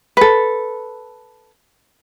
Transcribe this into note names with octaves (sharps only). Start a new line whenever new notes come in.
A4 B4